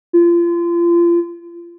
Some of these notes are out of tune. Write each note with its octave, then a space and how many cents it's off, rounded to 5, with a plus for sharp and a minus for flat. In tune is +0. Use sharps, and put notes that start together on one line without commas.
F4 -30